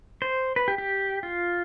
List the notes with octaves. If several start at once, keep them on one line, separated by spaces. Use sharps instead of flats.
C5
B4
G4
G4
F4